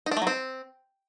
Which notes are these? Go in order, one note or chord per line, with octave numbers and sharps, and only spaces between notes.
D#4
D4
A3
F#3
C4